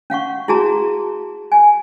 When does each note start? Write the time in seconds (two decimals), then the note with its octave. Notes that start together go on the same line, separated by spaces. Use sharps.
0.10 C#4 F5 F#5 C#6
0.48 E4 F#4 G#4 A5 A#5
1.52 G#5